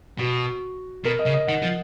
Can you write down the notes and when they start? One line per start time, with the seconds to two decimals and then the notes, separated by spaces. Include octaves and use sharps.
0.19 B2 F#4
1.05 B2 A#4
1.19 D#5
1.26 C#3
1.34 D#5
1.47 D#3 F#5
1.62 F3